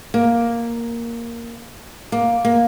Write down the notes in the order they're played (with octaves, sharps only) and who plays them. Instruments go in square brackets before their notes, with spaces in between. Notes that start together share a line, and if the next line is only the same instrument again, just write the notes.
[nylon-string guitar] A#3
A#3
A#3